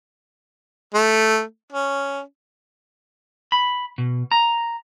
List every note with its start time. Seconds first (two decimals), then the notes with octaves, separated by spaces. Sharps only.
0.94 A3
1.72 C#4
3.52 B5
3.98 B2
4.31 A#5